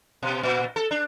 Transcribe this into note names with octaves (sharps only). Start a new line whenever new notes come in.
B2
A#2
A4
D4